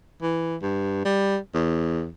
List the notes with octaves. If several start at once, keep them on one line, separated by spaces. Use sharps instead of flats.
E3
G2
G3
E2